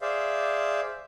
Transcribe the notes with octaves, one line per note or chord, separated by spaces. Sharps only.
G#4 C5 D5 E5 F5